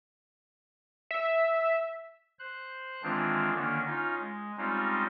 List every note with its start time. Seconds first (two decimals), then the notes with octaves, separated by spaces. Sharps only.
1.11 E5
2.39 C5 F#6
3.03 D#3 E3 G#3 C4 D4 F4
3.55 D3 D#3 A#3 C#4 D4
3.86 C#4 D#4 F4
4.19 G#3
4.57 G3 G#3 C4 C#4 D#4 F4